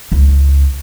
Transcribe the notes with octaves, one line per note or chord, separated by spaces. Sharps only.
C#2